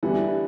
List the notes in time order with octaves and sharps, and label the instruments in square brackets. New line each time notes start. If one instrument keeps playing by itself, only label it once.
[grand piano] D3 [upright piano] E3 G3 B3 E4 G4